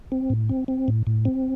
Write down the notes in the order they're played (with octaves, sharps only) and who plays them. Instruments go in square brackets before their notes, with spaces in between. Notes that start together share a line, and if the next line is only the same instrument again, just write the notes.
[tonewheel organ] C4
A2
C4
C4
A2
A2
C4